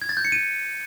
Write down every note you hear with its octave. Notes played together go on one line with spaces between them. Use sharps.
G#6
A6
G6
C#7
D#7